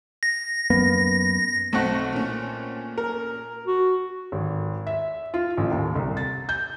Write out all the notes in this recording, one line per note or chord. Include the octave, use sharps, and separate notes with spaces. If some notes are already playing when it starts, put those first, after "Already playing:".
A#6
F#2 A#3 B3
B1 A3 C4 F#5 A5 C#6
A#2 C#4
A#4
F#4
G#1
E5
F4
A1
D#2
C2
A6
G6